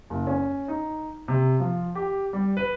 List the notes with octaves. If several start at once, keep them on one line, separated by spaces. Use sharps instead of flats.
F#1
C#4
D#4
C3
F3
G4
G3
B4